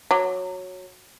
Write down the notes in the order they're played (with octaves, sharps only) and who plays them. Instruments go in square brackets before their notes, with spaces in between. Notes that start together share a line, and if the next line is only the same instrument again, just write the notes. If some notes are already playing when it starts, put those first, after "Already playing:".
[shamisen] F#3